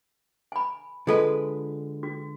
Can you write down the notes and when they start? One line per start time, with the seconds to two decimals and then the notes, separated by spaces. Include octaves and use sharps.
0.52 G#5 B5
1.07 D3 G#3 F4 A4 B4 G#5
2.03 F#4